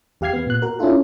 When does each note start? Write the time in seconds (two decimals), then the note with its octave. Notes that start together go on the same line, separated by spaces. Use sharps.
0.21 E2 G4 F5 F6 G#6 C7
0.33 B3
0.47 A#2 F#6
0.62 F#4 A#4
0.79 C#4 D4 E4 F4 A4